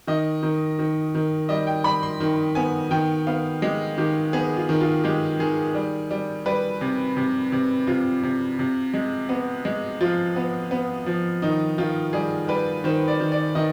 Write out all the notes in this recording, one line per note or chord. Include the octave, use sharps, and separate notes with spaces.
D#3 D#5
D#3
D#3
D#3
G3 D#5
G5
G3 B5
C6
D#3 C6
B3 G#5
D#3 G5
B3 F5
G#3 G4
D#3 G4
B3 G#4
F4
D#3
F4
G#3 G4
D#3 G#4
G3
G3
G3 B4
C3
C3
C3
C3 F4
C3
C3
G#3
B3
G#3
F3 F4
B3
B3
F3
D#3 D#4
D#3 F4
G3 G#4
G3 B4
D#3 C5
D5
D#3
D5
D#3 D#5